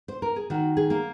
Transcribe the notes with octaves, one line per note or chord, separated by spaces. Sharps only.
C5
A#4
G#4
D#3 F#4
G#4
A#3